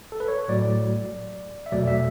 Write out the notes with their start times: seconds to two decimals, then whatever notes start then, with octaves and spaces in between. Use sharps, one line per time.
0.12 A4
0.20 B4
0.28 C#5
0.48 A2 F#3 A3 D5
1.66 E5
1.72 E2 B2 F#3 A3 D5
1.88 E5